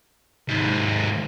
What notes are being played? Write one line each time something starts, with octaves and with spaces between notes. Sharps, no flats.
D#2 G#2